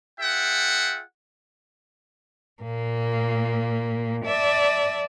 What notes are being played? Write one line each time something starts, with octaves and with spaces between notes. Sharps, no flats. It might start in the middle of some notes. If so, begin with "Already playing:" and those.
F4 G#4 E5 F#5 G5
A#2 A#3
D5 E5 A5